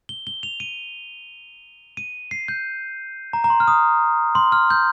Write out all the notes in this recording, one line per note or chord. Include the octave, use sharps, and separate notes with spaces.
G7
G7
F7
D#7
D#7
C7
G6
A#5
A#5
C6
F6
D#6
C6
F6
G6